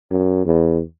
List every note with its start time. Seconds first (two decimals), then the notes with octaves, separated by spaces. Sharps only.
0.11 F#2
0.45 E2